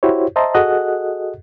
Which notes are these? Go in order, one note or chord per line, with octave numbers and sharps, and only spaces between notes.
E4 F#4 G4 C5 C#5
C5 D#5 E5 A5 A#5 C6
F#4 G#4 A4 D#5 F#5 F#6